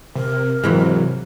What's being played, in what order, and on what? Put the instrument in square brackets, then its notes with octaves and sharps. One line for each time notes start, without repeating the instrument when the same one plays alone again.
[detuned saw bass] C3 [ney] A#4
[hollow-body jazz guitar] F2 E3 G#3 [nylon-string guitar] G#2 F#3 [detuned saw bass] C3